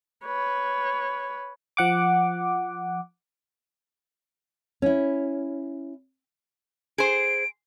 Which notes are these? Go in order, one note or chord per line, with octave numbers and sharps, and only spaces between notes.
B4 C#5
F3 F#5 D6
C#4 E4
G#4 C5 D7